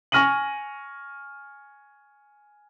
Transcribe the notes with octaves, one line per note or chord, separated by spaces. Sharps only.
G#5 C#6 F6 A#6 D#7 F#7